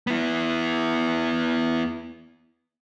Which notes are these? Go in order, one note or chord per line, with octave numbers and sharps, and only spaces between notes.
B3 E4